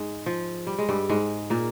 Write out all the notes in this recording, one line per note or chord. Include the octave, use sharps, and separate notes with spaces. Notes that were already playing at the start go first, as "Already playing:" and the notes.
Already playing: G#2 G#3
F3
G3
G#3
G2 G3
G#2 G#3
A#2 A#3